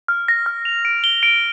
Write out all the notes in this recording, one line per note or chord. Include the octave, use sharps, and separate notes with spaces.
F6
A#6
F6
F7
D7
G7
D7